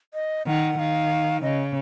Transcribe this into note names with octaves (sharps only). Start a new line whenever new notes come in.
D#5
D#3 F#5
D#3 F5
C#3 D#5